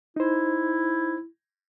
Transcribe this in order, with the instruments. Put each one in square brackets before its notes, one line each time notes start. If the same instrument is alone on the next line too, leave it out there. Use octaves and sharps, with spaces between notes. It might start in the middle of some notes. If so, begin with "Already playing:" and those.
[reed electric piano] D#4 C5 [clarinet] E4